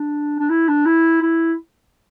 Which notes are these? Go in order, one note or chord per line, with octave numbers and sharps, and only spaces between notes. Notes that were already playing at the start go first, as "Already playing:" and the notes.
Already playing: D4
D4
E4
D4
E4
E4